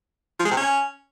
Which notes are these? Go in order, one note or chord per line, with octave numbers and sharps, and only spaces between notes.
F3
G#3
C3
C#4